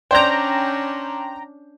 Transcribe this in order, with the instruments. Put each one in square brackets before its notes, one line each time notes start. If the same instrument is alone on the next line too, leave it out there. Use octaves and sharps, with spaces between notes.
[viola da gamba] C#4 D4 [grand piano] C5 D5 G6 [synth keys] G5 A#5